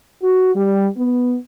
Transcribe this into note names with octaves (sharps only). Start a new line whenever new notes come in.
F#4
G3
B3